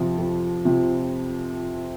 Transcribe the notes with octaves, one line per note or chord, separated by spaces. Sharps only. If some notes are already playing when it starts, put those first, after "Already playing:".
Already playing: F2 C3 F3
F2
C3 F3